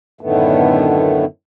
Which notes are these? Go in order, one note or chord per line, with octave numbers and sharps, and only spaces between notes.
F#2 A2 D3 D#3 A3 B3